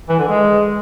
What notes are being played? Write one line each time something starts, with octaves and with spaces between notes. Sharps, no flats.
E3
D3
G#3